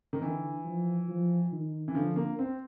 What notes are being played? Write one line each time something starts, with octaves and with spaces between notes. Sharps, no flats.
D#3
D3 E3
F3
F3
D#3
E3
D3 F3
A#3
C4